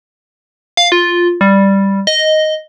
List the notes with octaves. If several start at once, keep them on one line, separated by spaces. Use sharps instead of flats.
F5
F4
G3
D#5